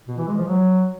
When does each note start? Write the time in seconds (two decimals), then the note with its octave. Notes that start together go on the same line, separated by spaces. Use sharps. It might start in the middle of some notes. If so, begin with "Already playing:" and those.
0.08 B2
0.18 E3
0.28 G#3
0.38 F3
0.48 F#3